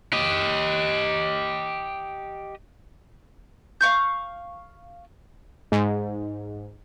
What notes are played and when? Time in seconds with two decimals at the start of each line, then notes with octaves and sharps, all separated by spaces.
0.13 G4 D#5
3.81 F5 F#5 C#6 G6
5.72 G#2